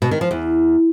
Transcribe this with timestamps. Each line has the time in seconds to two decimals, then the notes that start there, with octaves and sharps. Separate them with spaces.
0.02 B2
0.11 D#3
0.21 F3
0.31 E2